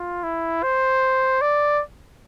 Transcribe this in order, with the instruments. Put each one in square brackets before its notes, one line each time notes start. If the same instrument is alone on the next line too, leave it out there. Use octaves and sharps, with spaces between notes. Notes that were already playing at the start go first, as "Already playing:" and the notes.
Already playing: [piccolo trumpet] F4
E4
C5
D5